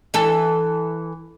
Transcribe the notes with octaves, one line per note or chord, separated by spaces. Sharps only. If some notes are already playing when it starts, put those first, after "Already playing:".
E3 A4